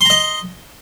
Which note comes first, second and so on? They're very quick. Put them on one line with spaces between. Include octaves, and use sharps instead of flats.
C6 A#5 D#5